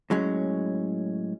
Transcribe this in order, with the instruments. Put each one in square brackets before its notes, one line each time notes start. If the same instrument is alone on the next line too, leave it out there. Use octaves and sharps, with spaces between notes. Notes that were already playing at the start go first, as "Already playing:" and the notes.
[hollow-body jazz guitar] A2 F#3 G#3 C#4